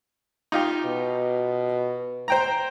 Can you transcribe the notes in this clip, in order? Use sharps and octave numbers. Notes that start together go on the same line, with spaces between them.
D#4 F4 G4
B2
C5 G5 A#5